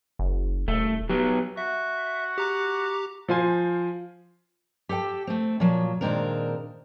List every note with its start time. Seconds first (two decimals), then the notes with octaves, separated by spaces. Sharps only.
0.19 F#1
0.68 D#1 A3
1.09 F#3 B3 G4
1.57 F#4 E5
2.38 G4 A#5 D6
3.29 F3 F4 C5 G#5
4.89 G4 A4 C5 G5 A5
5.27 A3 C4
5.60 A#2 F3 F#3
6.01 A#2 D#3 G#3 C4 D4 A#4